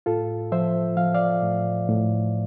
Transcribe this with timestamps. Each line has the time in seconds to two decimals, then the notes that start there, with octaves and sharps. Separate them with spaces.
0.06 A2 F4 A4
0.52 F3 C5 E5
0.97 F3 F5
1.14 D5 F5
1.42 A2
1.89 A2